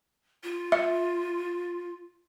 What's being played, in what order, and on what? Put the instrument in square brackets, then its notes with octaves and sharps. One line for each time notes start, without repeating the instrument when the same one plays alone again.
[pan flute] F4
[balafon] E5